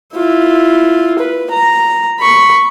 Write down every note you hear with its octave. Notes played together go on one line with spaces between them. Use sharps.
E4 F4
B4
A#5
B5 C#6